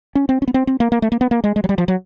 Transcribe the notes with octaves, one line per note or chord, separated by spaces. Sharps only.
C#4
C4
C#4
B3
C4
C4
A#3
A#3
A3
A#3
B3
A#3
G#3
G#3
F#3
G3
F3
F#3